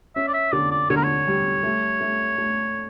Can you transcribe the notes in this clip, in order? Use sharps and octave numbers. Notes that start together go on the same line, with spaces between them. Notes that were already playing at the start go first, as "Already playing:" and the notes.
C#4 E5
D5
E5
D3 D5
D5
D3 C#5
A#4
C#5
G3
A3
A3
A3